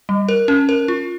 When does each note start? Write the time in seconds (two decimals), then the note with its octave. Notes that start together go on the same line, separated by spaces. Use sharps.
0.09 G3
0.29 A#4
0.48 C#4
0.69 A#4
0.88 F4